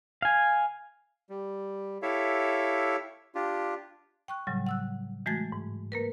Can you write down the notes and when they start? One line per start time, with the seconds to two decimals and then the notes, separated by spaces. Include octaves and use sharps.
0.22 F5 G#5
1.29 G3
2.02 E4 G4 A4 C#5 E5 F5
3.35 D4 F4 G4
4.28 G5 C#6 F#6
4.47 A2 C#3 F#3 G3
4.67 F#5 E6 F#6
5.26 E3 G#3 A3 F#4 G#6 A6
5.52 G#2
5.92 A#3 A#4 B4